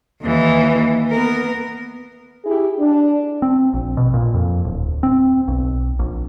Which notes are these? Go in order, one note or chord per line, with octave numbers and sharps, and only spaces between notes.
D#2 E3
B3 A#4
E4 G4 G#4
D4
C4
A#1
B2
A#2
F2
D1
C4
B1
A#1